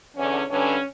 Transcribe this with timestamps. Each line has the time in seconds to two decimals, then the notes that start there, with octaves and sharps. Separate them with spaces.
0.16 E2 D3 C#4
0.49 G2 D3 C#4